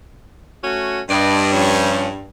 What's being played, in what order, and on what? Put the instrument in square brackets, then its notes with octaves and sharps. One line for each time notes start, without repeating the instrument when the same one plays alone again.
[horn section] A3 C#4 F#4
[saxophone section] G2 [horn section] B4 D5 D#5
[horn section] F3 C#4